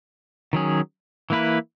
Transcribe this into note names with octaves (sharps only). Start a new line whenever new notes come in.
D#3 F#3 C#4 G#4
E3 A#3 E4 B4